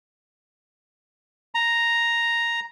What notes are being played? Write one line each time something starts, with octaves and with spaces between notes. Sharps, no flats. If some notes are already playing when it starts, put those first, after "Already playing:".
A#5